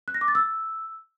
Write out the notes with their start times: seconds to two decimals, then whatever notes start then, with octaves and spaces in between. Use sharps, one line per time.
0.08 F#6
0.14 A#6
0.21 D6
0.28 A6
0.35 E6